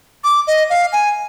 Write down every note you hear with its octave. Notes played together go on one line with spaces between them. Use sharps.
D6
D#5
F5
G#5